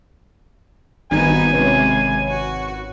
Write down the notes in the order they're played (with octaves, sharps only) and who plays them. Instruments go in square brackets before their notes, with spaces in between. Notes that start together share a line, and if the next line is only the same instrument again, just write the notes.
[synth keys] G#1 [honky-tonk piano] G2 D#3 G#6 [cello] B3 D#4 [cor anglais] G#5
[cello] C3 G#3 [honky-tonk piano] C#4 B4 C#5
[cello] F#4